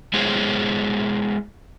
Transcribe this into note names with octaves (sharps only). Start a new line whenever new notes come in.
G#3 B3 E4 G#4 C5 C#5